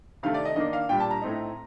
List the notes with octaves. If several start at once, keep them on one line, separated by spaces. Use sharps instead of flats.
C3 D#3 A3 F5
D5
D#5
D#3 A#3 D4 D#5
F5
A#2 G3 D4 G5
A5
A#5
A2 A3 C4 D#4